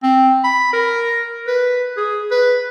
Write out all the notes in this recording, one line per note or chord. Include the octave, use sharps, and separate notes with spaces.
C4
B5
A#4
B4
G#4
B4